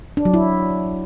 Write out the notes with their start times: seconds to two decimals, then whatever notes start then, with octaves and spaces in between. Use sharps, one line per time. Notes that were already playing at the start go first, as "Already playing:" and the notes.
0.17 D4
0.25 F#3
0.34 E4